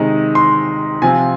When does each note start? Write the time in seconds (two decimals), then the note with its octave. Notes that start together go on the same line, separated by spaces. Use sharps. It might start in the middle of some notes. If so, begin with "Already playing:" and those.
Already playing: C3 D#3 G#3 D#4
0.35 C6
1.02 C3 F3 C4 F4 G#5